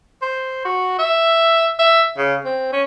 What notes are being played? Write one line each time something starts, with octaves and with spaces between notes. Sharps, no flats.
C5
F#4
E5
E5
C#3
C4
C#4